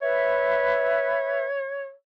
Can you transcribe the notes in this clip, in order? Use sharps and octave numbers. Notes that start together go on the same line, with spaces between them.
B4 C#5 E5